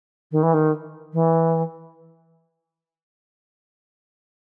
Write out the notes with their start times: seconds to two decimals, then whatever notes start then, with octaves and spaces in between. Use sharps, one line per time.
0.32 D#3
0.43 E3
0.54 D#3
1.13 E3